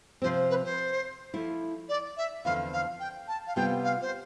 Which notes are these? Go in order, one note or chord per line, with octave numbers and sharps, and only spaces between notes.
C3 F3 C4 C5
B4
C5
F3 A3 E4
D5
E5
E2 D3 F3 C4 F5
F5
G5
A5
F5
C3 G3 B3 F4 G5
F5
C5